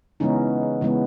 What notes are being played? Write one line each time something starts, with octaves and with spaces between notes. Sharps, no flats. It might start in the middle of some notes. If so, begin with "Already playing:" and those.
C#3 E3 G#3 B3 C#4 D#4
C#3 E3 G#3 B3